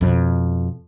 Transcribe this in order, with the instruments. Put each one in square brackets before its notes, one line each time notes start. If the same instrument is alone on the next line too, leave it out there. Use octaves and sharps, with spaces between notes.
[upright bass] F2 B2